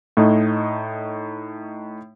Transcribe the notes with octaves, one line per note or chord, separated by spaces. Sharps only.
A2 A3 D#4 D#5